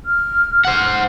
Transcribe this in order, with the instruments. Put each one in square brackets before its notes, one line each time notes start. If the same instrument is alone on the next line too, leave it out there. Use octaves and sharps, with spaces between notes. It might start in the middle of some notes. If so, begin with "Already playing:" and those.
[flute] F6
[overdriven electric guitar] C5 F#5